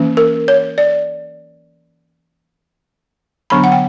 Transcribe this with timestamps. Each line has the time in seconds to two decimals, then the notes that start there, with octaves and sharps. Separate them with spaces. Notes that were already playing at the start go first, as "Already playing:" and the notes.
Already playing: E3 A#3 C#4
0.17 A#4
0.48 C#5
0.78 D5
3.50 D3 F#3 B3 D4 B5
3.64 F#5
3.72 G5